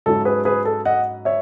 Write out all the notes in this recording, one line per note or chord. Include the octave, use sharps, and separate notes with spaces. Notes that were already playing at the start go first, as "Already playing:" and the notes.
G#2 F#3 C#4 E4 A4
G#4 B4
G#4 B4
A4
D#5 F#5
C#5 E5